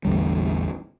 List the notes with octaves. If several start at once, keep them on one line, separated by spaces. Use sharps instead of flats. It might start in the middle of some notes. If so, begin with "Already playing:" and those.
A1 E2 D3 G3